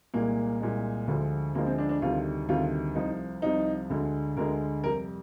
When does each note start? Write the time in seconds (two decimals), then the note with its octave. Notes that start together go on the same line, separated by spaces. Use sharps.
0.14 C2 A#2 G#3 A#3
0.61 C2 A#2 G#3
1.08 D2 D3 F3 G#3
1.55 D2 D3 F3 G#3 A#3
1.67 C4
1.78 D4
1.89 D4
2.02 D2 C3 D#3 G3 F4
2.49 D2 C3 D#3 G3 F4
2.95 C2 C3 F3 D#4
3.42 C2 C3 F3 D#4
3.90 D2 D3 G#3
4.37 D2 D3 G#3 A#4
4.84 F2 C3 G3 A#4